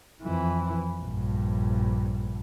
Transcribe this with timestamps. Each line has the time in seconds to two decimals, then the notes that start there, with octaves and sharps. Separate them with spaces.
0.22 F2 E3
1.00 A#1 G2